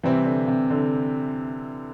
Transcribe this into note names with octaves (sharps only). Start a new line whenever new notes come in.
C3 E3 G3 C4 E4
D3
C3
D3